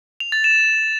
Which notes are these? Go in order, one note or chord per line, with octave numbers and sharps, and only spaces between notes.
F7
A6
E7